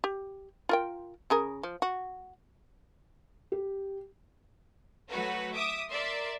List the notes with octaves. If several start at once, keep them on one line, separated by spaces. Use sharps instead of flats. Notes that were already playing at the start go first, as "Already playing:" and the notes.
G4
F4 A#4 G5
C#3 G#4 A#4
F3
F#4
G4
F#3 A3 F#4 B4 C#5
E5 D6 D#6
A#4 D5 E5 C6